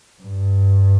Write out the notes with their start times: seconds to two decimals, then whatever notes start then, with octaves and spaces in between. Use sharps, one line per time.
0.22 G2